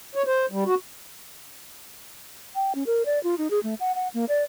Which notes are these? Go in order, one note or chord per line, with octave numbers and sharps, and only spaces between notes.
C#5
C5
G3
F#4
G5
C#4
A#4
D5
F4
D#4
G#4
A3
F#5
F#5
A#3
D5